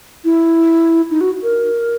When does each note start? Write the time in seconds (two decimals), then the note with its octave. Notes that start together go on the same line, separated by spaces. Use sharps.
0.25 E4
1.11 D#4
1.21 F#4
1.43 A#4